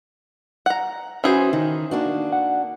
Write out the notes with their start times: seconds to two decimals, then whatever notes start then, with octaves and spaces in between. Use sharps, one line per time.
0.66 F#5 A#5
1.24 E3 C#4 F#4 G#4 C5
1.53 D#3 D#4
1.91 A#3 D4 F#4
2.32 F#5